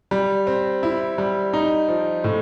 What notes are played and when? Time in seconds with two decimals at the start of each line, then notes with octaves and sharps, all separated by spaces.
0.11 G3
0.47 C4
0.83 E4
1.18 G3
1.53 D#4
1.89 F3
2.24 A2